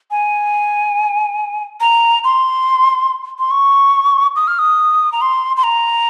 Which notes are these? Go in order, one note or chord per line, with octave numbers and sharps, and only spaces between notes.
G#5
A#5
C6
C6
C#6
D#6
F6
D#6
A#5
C6
C6
A#5